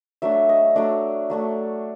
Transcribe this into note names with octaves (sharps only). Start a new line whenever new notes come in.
F#3 A3 D4 E5
D#5
F#3 A3 D4 D5
F#3 A3 D4